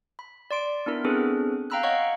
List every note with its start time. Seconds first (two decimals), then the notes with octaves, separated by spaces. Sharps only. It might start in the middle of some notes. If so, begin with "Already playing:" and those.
0.19 B5
0.51 D5 C6 D7
0.86 B3 D4 E4 A#4
1.05 B3 C4 D4 G#4 A4 B4
1.70 F5 G5 A#5 B5 E6 F#6
1.83 C#5 D#5 F5 F#5 C#6